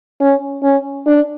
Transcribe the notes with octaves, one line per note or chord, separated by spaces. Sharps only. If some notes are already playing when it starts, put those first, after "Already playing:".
C#4
C#4
D4